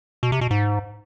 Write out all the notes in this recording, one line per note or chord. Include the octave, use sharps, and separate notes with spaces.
B2
C3
B2
G#2